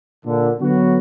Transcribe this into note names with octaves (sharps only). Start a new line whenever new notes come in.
A#2 D3
D3 F#3 B3 F#4